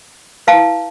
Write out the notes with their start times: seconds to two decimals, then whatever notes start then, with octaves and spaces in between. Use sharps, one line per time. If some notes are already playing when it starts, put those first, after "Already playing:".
0.47 E4 B4 F5 A5